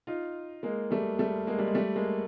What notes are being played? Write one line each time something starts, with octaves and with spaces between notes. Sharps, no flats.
D#4 F4
G#3 A#3
G3 A3
G3 A3
G#3 A#3
G3
G#3
G3 A3
G#3 A#3